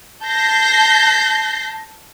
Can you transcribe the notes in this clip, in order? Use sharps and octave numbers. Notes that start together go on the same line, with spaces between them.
A5 G6 A#6 C7